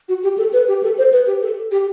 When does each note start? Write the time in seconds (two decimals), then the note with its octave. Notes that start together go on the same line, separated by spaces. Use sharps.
0.09 F#4
0.23 G4
0.38 A4
0.53 B4
0.68 G4
0.83 A4
0.98 C5
1.12 B4
1.27 G4
1.42 A4
1.72 G4